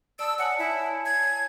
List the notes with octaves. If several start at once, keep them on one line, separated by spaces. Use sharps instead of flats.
D5 A5 D#6 E6
C#5 F#5 G#5 A5
E4
G#6